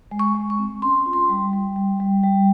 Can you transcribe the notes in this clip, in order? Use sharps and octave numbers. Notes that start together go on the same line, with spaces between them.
G#3
C#6
G#3
C#6
C4
C#4 C6
F4
C6
G3
G3
G3
G3
G3